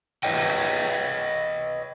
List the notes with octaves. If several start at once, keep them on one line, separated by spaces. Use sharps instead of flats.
B4 C#5 D#5 G5